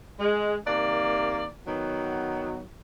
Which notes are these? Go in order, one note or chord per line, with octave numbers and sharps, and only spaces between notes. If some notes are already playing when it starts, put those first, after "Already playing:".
G#3
C3 D#3 A#3 D5
D#3 F#3 B3